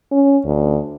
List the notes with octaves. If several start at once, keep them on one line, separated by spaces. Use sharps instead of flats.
C#4
D2